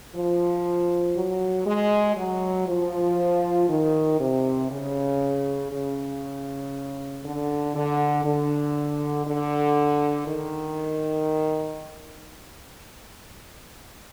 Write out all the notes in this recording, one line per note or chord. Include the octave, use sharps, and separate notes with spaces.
F3
F#3
G#3
F#3
F3
D#3
C3
C#3
C#3
D3
D3
D3
D3
D#3